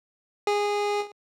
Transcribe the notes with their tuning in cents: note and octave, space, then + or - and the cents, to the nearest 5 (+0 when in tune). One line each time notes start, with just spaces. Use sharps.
G#4 -15